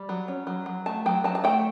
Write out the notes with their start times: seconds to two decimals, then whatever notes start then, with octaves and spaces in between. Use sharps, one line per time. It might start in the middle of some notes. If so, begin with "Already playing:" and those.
Already playing: G3
0.09 F#3
0.28 C#4
0.47 F#3
0.66 F#3
0.86 A3 A5
1.06 F#3 G5
1.24 F#3 A5
1.35 A5
1.44 A3 G5